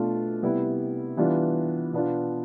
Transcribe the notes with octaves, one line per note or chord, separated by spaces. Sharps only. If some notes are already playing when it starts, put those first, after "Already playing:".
Already playing: B2 A3 D4 F4
C3 G3 B3 E4
E3 G3 B3 D4 F4
B2 B3 D4 F4